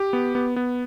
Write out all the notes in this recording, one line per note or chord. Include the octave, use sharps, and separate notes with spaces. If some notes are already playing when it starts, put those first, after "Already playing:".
Already playing: G4
B3
B3
B3